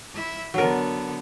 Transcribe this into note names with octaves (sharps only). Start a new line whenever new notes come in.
E4 E5
D3 F#3 B3 A#4